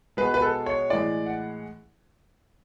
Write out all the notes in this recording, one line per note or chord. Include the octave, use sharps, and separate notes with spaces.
B2 G#3 B4
B4
A4
C#5
A2 E3 G#3 D5
F#5